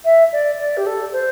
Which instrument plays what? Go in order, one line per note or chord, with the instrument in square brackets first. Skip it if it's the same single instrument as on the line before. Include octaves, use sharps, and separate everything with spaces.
[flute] E5
D5
D5
G4
A4
C5